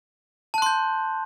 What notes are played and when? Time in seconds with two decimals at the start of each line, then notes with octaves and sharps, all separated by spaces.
0.54 A5
0.58 F#6
0.62 C6
0.66 G6